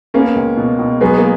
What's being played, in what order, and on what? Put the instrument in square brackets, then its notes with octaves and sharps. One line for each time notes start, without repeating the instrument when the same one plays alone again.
[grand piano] A#3 C#4 [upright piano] B3
[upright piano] C#2
B2
B2
[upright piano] F#3 [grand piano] G#3 B3
[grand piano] A#3